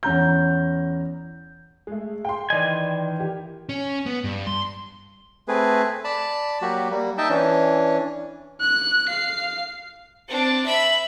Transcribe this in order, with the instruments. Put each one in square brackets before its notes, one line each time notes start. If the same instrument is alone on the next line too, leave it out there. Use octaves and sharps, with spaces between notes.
[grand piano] E2 C#4 A#5 G6
[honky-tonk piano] G#3 A3 [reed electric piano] G#4
[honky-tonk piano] G5 C6
[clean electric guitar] D#3 E3 G#5 [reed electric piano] D5 D#5
[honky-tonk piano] G4
[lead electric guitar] C#4
B3
G2
C6
[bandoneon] A3 C4 G#4 B4
D5 A5 B5
F#3 A#3 F#4 G4
G3 A#3
D#4 D#5 E5 G5 A5
E3 C#4 D4
[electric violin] F#6
F5 C7
[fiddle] C4 D4
E5 B5